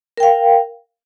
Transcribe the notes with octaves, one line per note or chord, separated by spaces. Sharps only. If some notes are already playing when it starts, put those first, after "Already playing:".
A#4 F5 G5